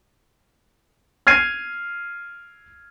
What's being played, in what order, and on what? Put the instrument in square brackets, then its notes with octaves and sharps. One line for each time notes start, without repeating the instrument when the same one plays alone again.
[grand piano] F6 G#6 C7 D#7